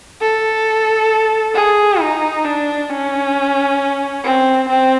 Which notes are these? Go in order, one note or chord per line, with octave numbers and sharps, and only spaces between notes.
A4
G#4
D#4
D4
C#4
C4
C4